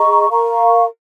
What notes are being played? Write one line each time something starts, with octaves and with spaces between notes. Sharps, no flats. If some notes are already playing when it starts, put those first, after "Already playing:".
Already playing: G#4 D#5 A#5 C#6
A#4 F5 A#5 C#6